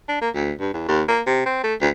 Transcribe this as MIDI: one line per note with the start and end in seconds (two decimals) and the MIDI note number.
0.08 0.21 62
0.21 0.30 58
0.34 0.52 38
0.60 0.72 43
0.74 0.86 40
0.88 1.03 39
1.08 1.21 58
1.26 1.45 48
1.45 1.62 60
1.63 1.74 57
1.81 1.89 38